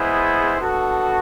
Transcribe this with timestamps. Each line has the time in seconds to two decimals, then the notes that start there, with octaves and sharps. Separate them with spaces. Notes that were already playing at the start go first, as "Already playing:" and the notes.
Already playing: G#3 B3 E4 G#4 C5
0.57 B3 D4 F#4 A4